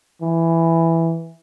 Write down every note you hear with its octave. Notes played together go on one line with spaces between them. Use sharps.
E3